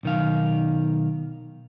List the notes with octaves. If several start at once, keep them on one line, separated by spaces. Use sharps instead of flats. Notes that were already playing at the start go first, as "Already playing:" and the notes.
B1 D#3 F5